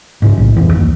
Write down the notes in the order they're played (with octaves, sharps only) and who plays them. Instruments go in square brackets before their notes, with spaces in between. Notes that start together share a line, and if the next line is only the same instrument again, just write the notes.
[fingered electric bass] G#2 C#3
B1 A2
D#1 F2 E3
F#1 D#2